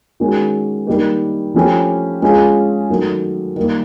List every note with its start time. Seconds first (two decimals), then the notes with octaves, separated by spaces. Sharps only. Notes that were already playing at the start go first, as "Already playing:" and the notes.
0.20 D#3 G#3 C#4 F#4
0.87 D#3 G3 A#3 D#4 G4
1.54 F3 A3 C#4 E4 G4
2.22 G#3 C#4 F4 G#4
2.90 D#3 F#3 A3
3.56 D#3 G3 A#3